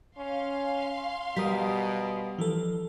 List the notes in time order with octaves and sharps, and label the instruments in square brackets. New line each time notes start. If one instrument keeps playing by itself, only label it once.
[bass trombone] C#4 [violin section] F5 C6
[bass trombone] B2 [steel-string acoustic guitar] G3 A#4 [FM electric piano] D#6 B6
[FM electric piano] E3 F3 A4